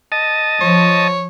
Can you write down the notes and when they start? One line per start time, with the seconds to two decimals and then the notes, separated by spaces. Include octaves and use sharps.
0.12 D#5 A5
0.61 F3 C#5